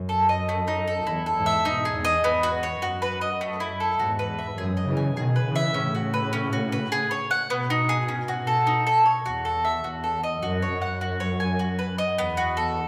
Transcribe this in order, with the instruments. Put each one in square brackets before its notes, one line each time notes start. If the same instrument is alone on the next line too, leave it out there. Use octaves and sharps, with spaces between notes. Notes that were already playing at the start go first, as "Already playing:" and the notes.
Already playing: [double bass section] F#2
[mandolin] A4
D#5
A3
D#4
A4
[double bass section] E2 [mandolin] E4
[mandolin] A4
[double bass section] E2 G#2
[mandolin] E5
[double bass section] G#2 B2 [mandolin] D#4
[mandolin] G#4
[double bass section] E2 G#2
[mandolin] D#5
[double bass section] E2 [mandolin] B3
[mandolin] F#4
C#5
[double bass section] F#2 [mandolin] F#4
[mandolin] B4
D#5
A3
E4
A4
[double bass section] E2 G#2 [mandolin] F#4
[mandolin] B4
E5
[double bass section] F#2 [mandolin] G#4
[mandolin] D#5
[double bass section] C#3 E3
[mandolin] G#5
[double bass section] B2 D#3 [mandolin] G#4
[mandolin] B4
[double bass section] C#3 E3
[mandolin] E5
[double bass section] A2 C#3 [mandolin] C#4
[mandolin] F#4
B4
C#4
F#4
B4
G#4
C#5
F#5
[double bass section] G#2 B2 [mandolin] B3
[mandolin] D#4
G#4
C#4
F#4
A4
D#4
A4
C#5
[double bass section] E2 [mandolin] F#4
[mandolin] A4
E5
[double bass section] E2 [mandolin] F#4
[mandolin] A4
D#5
[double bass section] F#2 [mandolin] F#4
[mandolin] C#5
[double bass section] F#2
[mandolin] F#5
F#4
C#5
G#5
F#4
B4
D#5
[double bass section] E2 [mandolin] B3
[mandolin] F#4
A4